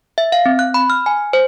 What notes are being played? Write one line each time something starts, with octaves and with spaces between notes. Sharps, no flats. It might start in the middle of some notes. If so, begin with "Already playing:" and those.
E5
F5
C4
F#6
B5
F6
G#5
C5